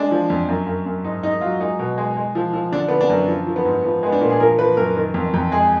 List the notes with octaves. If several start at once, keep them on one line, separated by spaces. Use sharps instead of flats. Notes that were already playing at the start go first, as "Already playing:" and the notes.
Already playing: G#3 D4
F3
F2
F#2
F#2
F#2
G#2 D#4
G#2 D#4
F#3 F4
G#3 D#4
B2
G#3
G#3
F3
F3
D3 D4
D3 B3
D4
F#2
F3
F3
B3
G#2
F3 B3
G#3 B3
D4
A#2
G#4
F3 A#4
F3 B4
F#2 A#4
D#3
F2
F2
G#3 G#4